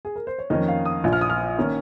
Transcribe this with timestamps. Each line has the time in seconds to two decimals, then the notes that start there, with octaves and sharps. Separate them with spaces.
0.05 G#4
0.16 A#4
0.27 C5
0.38 C#5
0.50 F2 D#3 A#3 C#4 D#5
0.68 F5
0.85 D#6
1.03 A#1 A#2 F3
1.13 F6
1.21 D#6
1.30 F6
1.58 D#3 A#3 C#4